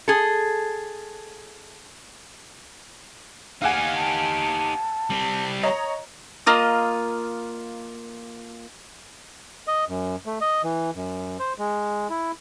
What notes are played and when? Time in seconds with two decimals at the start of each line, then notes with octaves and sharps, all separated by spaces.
0.08 G#4 A4
3.62 D#4 G4 F5 F#5 G#5
3.95 A5
5.10 G3 C4
5.63 C#5 D#5 A#5
6.46 A#3 F4 D#5
9.67 D#5
9.89 F#2
10.26 A3
10.41 D#5
10.64 E3
10.95 F#2
11.39 C5
11.58 G#3
12.10 E4